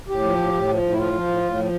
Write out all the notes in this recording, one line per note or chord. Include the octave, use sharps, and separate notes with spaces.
A2 G4
F3
A2
A2
F3
A2
E4
F3 F4
F3
A2
A2
F3